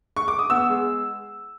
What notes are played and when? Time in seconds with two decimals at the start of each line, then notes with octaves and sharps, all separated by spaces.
0.17 C#6
0.28 D6
0.39 D#6
0.50 B3 E6
0.69 G#3